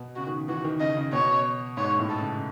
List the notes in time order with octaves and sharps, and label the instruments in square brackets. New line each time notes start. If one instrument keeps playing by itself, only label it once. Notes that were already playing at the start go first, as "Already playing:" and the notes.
Already playing: [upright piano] B2
[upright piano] C#3 [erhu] F#4
[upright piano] D#3
[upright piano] E3 [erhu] F#4
[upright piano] D#3
[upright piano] C#3 [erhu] D#5
[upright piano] C#3
[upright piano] B2 [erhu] C#5
[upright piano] G#2 [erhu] C#5
[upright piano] A2
[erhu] A4
[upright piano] C#3